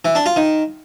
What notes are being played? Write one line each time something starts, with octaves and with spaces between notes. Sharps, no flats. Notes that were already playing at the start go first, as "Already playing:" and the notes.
E3
D4
F4
D#3